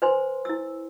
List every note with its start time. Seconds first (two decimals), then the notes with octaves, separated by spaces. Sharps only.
0.02 B4 C5 G#5 C6
0.45 E4 E6